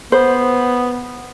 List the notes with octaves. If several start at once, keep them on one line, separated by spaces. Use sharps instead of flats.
B3 C5